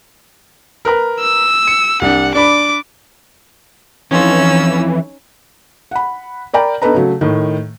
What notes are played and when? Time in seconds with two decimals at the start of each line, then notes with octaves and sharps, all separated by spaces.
0.85 A#4 B4 A#5
1.20 E6
1.67 C#7
2.01 C2 D4 F#5
2.35 D4 D5 B5 D6
4.11 F2 E3 C#4 D#4 F4 E6
5.91 F#5 B5
6.53 A#4 D5 G5 A#5 B5
6.82 B3 D4 D#4 A4 B4 A#5
6.94 C#3 F#3 A3
7.21 A2 D#3